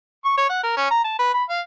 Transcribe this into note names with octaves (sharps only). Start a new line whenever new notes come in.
C#6
C#5
F#5
A#4
C#4
A#5
A5
B4
B5
F5